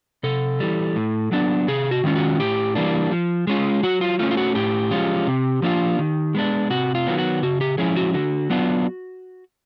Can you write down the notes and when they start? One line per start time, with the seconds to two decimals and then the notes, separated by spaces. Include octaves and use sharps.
0.23 C3 A4
0.60 E3 G3
0.96 A2
1.32 F#3 B3 D4
1.68 C3 G#4
1.91 F#4
2.04 D#3 G#3 C#4 F4
2.15 F#4
2.40 A2 G4
2.75 E3 G3 A#3 D4
3.11 F3
3.47 G#3 C#4 F4
3.83 F#3 F#4
4.01 F4
4.19 A3 F4
4.22 C#4
4.31 F4
4.37 F#4
4.55 A2 G4
4.91 F3 G#3 C#4 F4
5.27 C3
5.62 F3 A#3 D4 F4
5.99 D#3
6.35 G#3 B3 D4
6.70 C3 F#4
6.95 F4
7.07 D#3 F#3 B3
7.18 F#4
7.43 C#3 F#4
7.61 G4
7.78 F3 G#3 C#4 E4 G#4
7.96 F#4
8.14 D3 F#4
8.50 F#3 B3 D4 F4